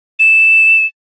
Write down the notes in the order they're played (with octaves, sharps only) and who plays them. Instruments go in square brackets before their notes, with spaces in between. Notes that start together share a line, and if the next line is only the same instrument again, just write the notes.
[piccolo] E7